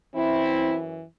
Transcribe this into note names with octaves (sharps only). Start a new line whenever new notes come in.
F#2 E3 C4 E4